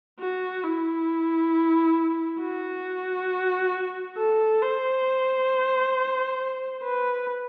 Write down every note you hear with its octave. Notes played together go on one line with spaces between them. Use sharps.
F#4
E4
F#4
A4
C5
B4